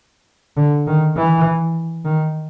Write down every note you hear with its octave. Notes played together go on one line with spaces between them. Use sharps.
D3
D#3
E3
D#3